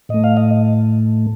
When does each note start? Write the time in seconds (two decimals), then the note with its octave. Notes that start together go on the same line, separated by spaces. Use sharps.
0.09 A2 A3 D#5
0.24 F5
0.37 D#5